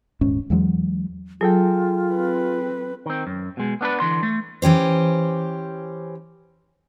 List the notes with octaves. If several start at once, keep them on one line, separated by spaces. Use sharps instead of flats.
D#1 G#2 C#4
E2 E3 F#3 G#3
F#3 F4 G#4 A4 G5
C4 B4
D#3 C4
F#2
B2 G#3
B3 D4 G#4 B4
D3 E3 C6
A3
E3 C#4 G4 C5